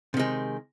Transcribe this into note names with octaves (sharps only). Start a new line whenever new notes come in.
C3 D#3 G#3